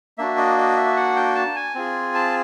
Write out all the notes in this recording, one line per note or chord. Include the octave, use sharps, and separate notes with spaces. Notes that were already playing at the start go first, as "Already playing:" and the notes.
A#3 D4 F#4 E5
D#5
D#5
E5
F#5
G5
A5
G#5
C4 F4 G#4
A5